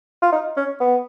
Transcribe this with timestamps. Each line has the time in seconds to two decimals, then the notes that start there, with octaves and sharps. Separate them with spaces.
0.22 F4
0.32 D#4
0.57 C#4
0.81 B3